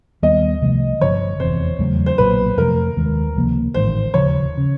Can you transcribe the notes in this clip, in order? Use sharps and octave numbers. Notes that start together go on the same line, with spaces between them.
D#2 D#3 G3 B3 D#5
C2 C3 F3 A3
G1 G2 D3 F3 C#5
F1 E2 C3 C5
E2 C#3 F#3 A3
C5
B1 A#2 F#3 B4
F2 C3 F3 A3 A#4
D#2 D#3 G#3
C#2 C3 F3 A#3
A1 G#2 D#3 C5
E1 D#2 C#3 F3 C#5
C#3